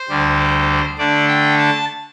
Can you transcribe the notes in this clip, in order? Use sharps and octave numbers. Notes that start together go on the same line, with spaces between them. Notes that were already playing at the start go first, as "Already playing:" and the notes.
Already playing: C5
D2 D3 G3
D3 A3 D4 D5
G5
A5